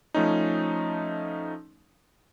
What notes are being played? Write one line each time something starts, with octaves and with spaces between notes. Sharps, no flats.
F3 A3 C#4 D#4